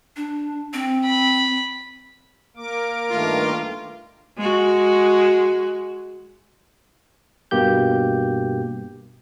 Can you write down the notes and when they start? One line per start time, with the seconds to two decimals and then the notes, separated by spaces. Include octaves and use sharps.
0.16 D4
0.73 C4
1.04 B5
2.57 A#3 A#4 D6
3.11 G2 D#3 A3 F4
4.38 G#3 F#4
7.51 G2 B2 A#3 G4 G6